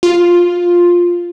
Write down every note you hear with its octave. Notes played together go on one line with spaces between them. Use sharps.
F4